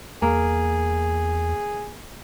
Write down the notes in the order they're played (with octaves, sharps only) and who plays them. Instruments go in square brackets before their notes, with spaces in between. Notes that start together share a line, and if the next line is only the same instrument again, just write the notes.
[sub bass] E2 [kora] A#3 [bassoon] G#4